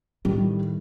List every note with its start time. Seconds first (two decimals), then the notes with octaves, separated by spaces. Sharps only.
0.25 A2 D#3 G3